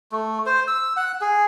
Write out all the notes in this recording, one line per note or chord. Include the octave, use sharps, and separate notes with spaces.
A3
C5
E6
F#5
G#4